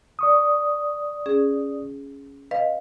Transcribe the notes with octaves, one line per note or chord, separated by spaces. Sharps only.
D5 C#6 D#6
C#4 G#4
B4 D#5 F5